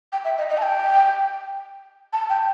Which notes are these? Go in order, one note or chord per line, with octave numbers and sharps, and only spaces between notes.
G5
E5
D#5
D#5
A5
G5
A5
G5